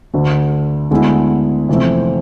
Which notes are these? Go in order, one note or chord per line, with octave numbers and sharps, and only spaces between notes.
D2 D3 A3
D2 D3 G#3 B3 E4
F1 F2 E3 A3 C4